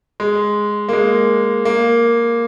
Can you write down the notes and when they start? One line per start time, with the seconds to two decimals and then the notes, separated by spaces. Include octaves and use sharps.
0.20 G#3
0.89 A#3
0.93 G#3
1.65 A#3